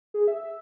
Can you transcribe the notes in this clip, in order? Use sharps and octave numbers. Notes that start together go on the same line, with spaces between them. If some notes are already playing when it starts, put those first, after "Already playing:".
G#4
E5
E5